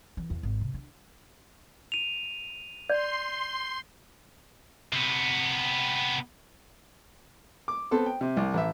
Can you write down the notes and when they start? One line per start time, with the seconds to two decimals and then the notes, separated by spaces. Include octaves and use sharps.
0.17 E3
0.30 E2
0.43 G#1
0.61 C3
0.74 D4
1.92 D#7 F7
2.90 D5 C6 G6
4.93 C3 B3
7.68 D6
7.91 B3 C4 A4 C5
8.06 G5
8.21 C3
8.37 C2
8.54 A1 E5